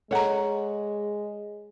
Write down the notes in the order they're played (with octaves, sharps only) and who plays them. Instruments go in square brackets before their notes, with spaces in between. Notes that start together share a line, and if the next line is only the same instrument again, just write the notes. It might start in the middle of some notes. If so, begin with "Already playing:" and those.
[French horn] G#3 [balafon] A4 A#5 [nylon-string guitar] C#5 F#5